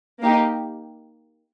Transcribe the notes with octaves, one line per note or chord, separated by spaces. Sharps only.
A#3 D#4 G4